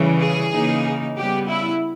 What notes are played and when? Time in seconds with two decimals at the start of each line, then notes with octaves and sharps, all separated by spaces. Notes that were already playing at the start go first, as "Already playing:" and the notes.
Already playing: C#3 E3 G3
0.20 G#4
0.52 C#3 E3 A#3 D#4
1.17 C#3 G3 B3 G4
1.48 E4